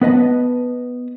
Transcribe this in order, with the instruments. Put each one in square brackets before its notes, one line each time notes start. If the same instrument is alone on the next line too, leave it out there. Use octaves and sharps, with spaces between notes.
[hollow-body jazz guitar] B3 B4 D#5 A5